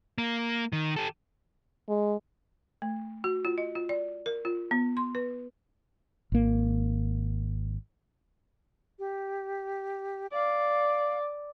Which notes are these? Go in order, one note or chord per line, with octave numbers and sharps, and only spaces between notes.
A#3
D#3
G4 A4
G#3
A3
F#4
F4
D#5
F4
D5
A#4
F4
B3
C6
B4
G#1 A#3
G4
D5 F5